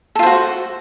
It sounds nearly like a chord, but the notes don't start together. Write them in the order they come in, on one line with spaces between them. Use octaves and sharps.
A4 F4 C5 F#4